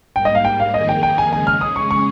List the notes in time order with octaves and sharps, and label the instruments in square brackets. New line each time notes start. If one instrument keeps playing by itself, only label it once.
[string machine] G#2 G3 A#3 [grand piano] G5
[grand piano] D#5
F5
G5
F5
[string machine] F2 D#3 A#3 D#4 G#4 [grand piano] D#5
[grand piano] G5
G5
G#5
[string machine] C#3 G#3 C#4 G#4 [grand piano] G#5
[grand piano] F6
D#6
C#6
C#6